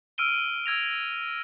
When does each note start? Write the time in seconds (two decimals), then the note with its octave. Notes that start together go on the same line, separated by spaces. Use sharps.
0.18 E6 F6 D7 D#7 G7
0.66 E6 G#6 A#6 F7